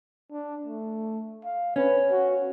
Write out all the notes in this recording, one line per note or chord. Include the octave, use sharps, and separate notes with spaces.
D4
A3
F5
C#4 B4
F#4